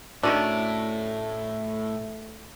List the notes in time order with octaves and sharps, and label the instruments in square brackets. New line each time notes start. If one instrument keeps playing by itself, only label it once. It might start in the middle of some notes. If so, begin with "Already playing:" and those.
[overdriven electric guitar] A2 [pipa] D#3 C#4 D4 [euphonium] A3 [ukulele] E4 F#4